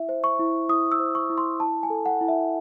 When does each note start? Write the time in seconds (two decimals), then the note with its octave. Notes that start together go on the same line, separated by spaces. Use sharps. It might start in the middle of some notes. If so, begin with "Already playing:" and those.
Already playing: E4 E5
0.09 C5
0.24 C#6
0.39 E4
0.69 E4 D#6
0.92 E6
1.00 C5
1.15 C#6
1.30 E4
1.38 C6
1.60 E4 A5
1.83 G#5
1.90 A4
2.06 F#5
2.21 E4
2.28 E5